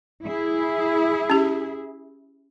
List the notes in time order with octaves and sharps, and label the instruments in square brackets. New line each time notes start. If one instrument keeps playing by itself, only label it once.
[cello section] E4 G#4
[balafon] C#4 G4